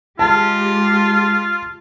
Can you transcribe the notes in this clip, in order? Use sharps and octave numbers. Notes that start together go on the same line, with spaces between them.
G#3 F4 G4 A5